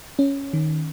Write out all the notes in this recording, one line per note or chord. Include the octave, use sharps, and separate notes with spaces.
C#4
D#3